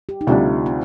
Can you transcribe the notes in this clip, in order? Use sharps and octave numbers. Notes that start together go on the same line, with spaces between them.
G4
D#4
D2 C3 G3 D4 F4
C4